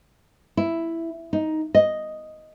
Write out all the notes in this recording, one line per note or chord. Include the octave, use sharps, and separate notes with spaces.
E4
D#4
D#5